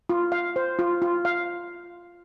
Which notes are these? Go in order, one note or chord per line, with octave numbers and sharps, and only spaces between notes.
F4
F5
C5
F4
F4
F5